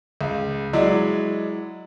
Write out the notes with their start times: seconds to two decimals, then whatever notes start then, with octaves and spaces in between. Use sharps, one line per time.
0.21 C#2
0.73 F#3 G#3 E4 D5